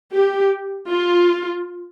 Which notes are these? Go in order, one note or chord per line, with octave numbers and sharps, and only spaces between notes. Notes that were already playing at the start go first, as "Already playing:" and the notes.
G4
F4